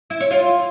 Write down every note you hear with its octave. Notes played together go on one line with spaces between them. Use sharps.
E4
C#5
F4